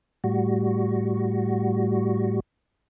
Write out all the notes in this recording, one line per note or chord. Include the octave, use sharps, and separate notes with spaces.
A2 G3 F#4